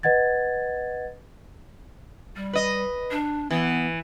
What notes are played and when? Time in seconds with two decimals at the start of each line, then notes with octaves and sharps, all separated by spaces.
0.03 B4 D#5 F#5 G#6 A6
2.36 G3
2.53 B4 D#5
3.11 D4
3.51 E3 B3